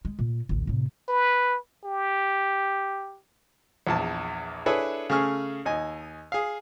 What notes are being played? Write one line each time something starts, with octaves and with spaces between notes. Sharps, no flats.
G#3
A#2
A1 D2
A2 C3
B4
G4
A#1 E2 A5
D4 E4 G#4 A4 B4 C#5
C#3 A3 G#4 C#6 F6
D#2 D#5 G#5
G#4 F5